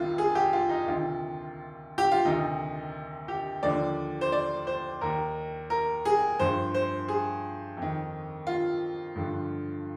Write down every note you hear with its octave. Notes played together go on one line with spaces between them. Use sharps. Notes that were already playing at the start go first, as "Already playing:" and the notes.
Already playing: C2 C3 D#3 F4
G#4
G4
F4
D#4
D2 C3 D#3 F4
G4
F4
D2 C3 D#3 D#4
G4
D#2 D3 F3 D5
C5
D5
C5
D#2 D#3 A#4
A#4
G#4
G2 F3 C5
C5
G#4
F2 D#3
F4
G2 D3 F3